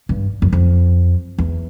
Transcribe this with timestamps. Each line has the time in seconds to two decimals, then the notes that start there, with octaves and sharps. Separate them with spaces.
0.09 G2
0.42 F#2
0.53 F2
1.38 E2